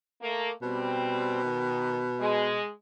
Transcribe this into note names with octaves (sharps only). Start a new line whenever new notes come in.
A3 A#3
B2 G3 C4
D#3
G#3